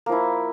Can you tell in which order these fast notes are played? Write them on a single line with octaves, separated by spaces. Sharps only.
A#3 F3 E4